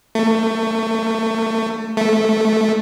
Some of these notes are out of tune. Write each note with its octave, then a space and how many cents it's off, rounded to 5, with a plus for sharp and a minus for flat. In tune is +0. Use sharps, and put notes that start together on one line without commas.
A3 +25
A3 -5